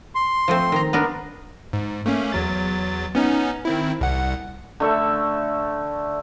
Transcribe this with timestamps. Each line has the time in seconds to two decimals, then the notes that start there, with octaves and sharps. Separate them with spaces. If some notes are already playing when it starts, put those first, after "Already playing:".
0.15 C6
0.48 F3 A3 C4
0.72 D#3 A#5
0.93 B3 D4 A#4
1.73 G#2
2.06 A3 A#3 C#4
2.32 E2 F#3 A6
3.15 B3 C#4 D#4
3.65 D#3 C4 E4
4.01 C2 F#5
4.80 D3 A3 E5